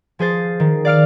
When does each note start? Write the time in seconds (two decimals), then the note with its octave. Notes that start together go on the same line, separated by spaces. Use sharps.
0.19 F3 G#4 C5 A6
0.60 D#3
0.85 D5 F5 F6 D7